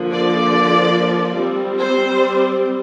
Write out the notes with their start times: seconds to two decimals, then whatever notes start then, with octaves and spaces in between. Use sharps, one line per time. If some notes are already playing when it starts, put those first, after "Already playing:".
Already playing: D3 F3 A#3
0.11 D5
1.37 G3 C4
1.79 C5